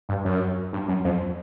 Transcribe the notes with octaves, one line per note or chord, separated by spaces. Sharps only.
G2
F#2
G2
F#2
F2